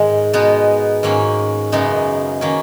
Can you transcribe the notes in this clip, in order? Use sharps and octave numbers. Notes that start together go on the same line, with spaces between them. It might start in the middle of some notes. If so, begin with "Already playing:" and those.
Already playing: G#2 D#3 G#3
B2 G#3 B3 D#4
G#2 D#3 A#3 C#4
F#2 C#3 G#3 B3 D#4
D#3 A#3 C#4